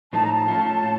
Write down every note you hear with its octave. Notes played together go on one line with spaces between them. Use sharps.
A2 F3 A3 D#4 A5
A#5
A5
A3 C#4 F4
A2